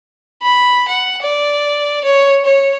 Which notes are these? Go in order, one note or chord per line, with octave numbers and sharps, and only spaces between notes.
B5
F#5
D5
C#5
C#5